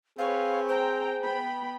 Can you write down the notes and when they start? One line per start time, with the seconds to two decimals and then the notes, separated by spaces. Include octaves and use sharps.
0.18 C4 G#4 B4 C#5 F5
0.69 C5 G5 A#5
1.22 B3 G5 B5